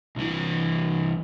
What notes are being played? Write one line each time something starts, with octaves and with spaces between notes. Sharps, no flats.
C2 E3